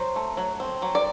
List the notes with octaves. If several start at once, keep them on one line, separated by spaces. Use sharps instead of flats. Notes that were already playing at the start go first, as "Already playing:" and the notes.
Already playing: F#3 C5
A3
F#3
C4
F#3
D5